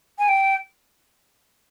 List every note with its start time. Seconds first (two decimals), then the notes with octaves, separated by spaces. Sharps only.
0.19 G#5
0.28 G5